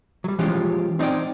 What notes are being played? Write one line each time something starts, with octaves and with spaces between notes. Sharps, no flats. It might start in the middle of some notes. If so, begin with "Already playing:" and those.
F#3 G3
E3 F3 G#3 C#4 F4 G4
C4 D#4 G4 D5 G5